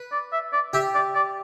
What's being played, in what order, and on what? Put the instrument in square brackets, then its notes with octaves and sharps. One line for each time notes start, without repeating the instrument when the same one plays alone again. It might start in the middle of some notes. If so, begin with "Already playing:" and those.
Already playing: [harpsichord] B4
[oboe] D5
E5
D5
[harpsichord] G4 [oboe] E5
[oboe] D5
D5